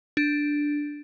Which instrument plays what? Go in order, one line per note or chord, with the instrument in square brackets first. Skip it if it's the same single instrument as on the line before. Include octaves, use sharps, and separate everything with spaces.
[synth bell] D4